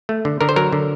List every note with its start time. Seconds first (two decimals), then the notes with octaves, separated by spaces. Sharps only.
0.09 A3
0.25 D3
0.41 D3 A#4
0.49 C5
0.56 F#3 A#4
0.73 D3